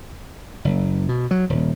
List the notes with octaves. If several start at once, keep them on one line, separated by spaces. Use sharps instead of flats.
F#1
B2
F#3
D#1